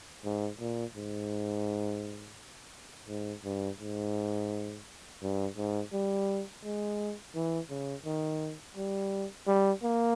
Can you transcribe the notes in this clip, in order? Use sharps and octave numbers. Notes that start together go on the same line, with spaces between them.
G#2
A#2
G#2
G#2
G2
G#2
G2
G#2
G3
G#3
E3
C#3
D#3
G3
G3
A#3